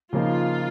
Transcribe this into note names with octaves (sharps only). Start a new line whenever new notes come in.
C#3 F3 A#3 D#4 F4